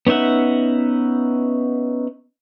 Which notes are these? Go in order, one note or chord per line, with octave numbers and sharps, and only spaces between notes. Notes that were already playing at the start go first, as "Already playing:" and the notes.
B3 C#4 D#4 E5 F#5